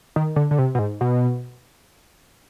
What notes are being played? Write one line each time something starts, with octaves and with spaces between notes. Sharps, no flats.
D#3
D3
D3
C3
B2
G#2
B2